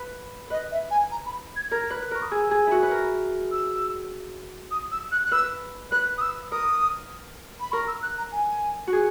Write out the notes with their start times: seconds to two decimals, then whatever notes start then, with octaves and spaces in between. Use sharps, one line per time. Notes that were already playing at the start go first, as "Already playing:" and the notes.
Already playing: B4
0.50 B4 D#5
0.71 E5
0.91 G#5
1.12 A#5
1.26 B5
1.56 G#6
1.70 A#4 G#6
1.90 B4
2.01 F#6
2.11 A#4 C#6
2.22 D#6
2.31 G#4 E6
2.51 G#4
2.67 E4 F#4
2.83 B4
2.91 A#4
3.52 E6
4.71 D#6
4.92 E6
5.12 F#6
5.25 F#6
5.32 B4 E6
5.92 B4 F#6
6.18 D#6
6.22 E6
6.52 A#4 D#6
7.60 B5
7.72 A#4 C#6
7.87 E6
8.03 F#6
8.18 A#5
8.32 G#5
8.87 F#4
8.93 G#4